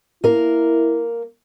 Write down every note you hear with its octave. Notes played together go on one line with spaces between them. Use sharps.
A#3 E4 A#4